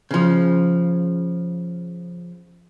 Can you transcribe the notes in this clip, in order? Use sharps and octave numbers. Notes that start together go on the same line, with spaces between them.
C#3 F3